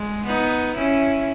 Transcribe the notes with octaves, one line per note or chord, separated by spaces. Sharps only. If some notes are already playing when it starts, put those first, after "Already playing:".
Already playing: G#3
B3 D#4
C#4 E4